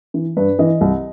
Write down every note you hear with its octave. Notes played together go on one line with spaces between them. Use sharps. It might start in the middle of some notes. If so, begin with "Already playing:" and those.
E3
G2 B4
E3 D#5
C2